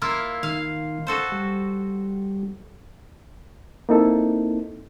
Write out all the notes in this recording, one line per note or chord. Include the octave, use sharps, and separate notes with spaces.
A#3 E4 F4
D#3 F5
F#4 A4 C5
G3
A#3 C4 D#4 E4 A4